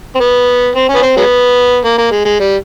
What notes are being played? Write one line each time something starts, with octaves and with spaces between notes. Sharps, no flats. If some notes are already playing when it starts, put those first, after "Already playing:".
C4
B3
C4
C#4
B3
C4
F#3 G#3 B3
A#3
A#3
G#3
G#3
G3